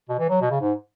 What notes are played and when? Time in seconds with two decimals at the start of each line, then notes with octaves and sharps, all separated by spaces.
0.09 B2
0.19 E3
0.30 F#3
0.42 B2
0.51 C#3
0.61 G#2